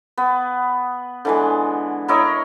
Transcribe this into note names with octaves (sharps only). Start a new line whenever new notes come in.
B3
D3 E3 G#3
E4 A#4 C#5 D#5